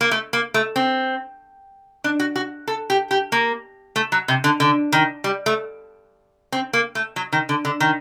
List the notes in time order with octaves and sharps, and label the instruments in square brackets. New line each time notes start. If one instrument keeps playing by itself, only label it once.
[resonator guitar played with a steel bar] A#3
A3
A#3
A3
C4
D4
F#4
F#4
A4
G4
G4
A#3
A3
F#3
C3
D3
D3
D#3
G3
A3
C4
A#3
A3
F#3
D#3
D3
D3
D#3